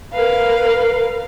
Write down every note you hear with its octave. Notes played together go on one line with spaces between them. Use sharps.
A#4 B4 F5